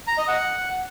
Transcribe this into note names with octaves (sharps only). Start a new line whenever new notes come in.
A#5
D#5
F#5